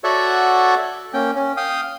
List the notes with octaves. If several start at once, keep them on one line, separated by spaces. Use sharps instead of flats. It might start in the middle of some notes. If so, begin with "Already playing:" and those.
F#4 A4 C#5 D5 E5 F#5
A#3 C#4 G5
C#4
F5 G5 D#6